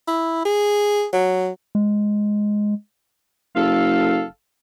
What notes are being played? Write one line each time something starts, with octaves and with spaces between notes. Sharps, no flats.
E4
G#4
F#3
G#3
F#1 A4 F5